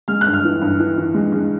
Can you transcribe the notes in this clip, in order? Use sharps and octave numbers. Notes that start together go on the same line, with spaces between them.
G#3 F6
F#6
G2
F6
E3
G2
E3
E3
G#3
G#3